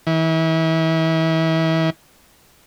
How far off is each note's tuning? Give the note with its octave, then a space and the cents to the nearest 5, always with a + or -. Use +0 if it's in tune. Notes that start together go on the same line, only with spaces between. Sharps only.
E3 -35